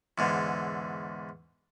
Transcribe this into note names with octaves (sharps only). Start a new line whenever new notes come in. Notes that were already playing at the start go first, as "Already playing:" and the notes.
E2 G#2 D3